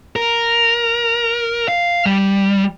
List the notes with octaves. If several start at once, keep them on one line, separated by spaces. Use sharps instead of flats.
A#4
F5
G3